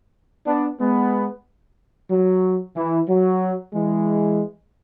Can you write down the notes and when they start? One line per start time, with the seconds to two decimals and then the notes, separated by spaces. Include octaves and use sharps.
0.47 B3 D4
0.80 G#3 B3
2.11 F#3
2.77 E3
3.08 F#3
3.74 E3 G#3